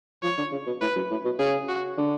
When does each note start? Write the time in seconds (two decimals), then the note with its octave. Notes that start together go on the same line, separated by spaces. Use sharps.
0.23 F3 C#5
0.38 D3
0.52 C#3
0.67 B2
0.81 A2 B4
0.96 F#2
1.11 A2
1.25 B2
1.39 C#3 G#4
1.68 F#4
1.98 D3